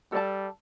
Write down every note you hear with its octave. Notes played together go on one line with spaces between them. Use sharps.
G3 A4 D5 A5